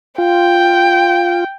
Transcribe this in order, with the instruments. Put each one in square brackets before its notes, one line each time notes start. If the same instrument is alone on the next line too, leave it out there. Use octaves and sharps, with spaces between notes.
[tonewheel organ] F4 [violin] G5